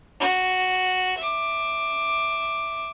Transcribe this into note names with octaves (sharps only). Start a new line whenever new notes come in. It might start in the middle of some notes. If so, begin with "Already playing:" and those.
F#4
E5 D6